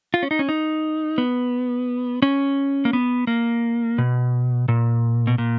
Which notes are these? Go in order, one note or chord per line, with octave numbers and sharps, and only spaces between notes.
F4
C#4
D#4
C#4
D#4
B3
C#4
A#3
B3
A#3
B2
A#2
B2
A#2